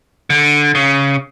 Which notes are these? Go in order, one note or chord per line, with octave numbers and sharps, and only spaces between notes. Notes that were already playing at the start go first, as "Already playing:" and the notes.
D3
C#3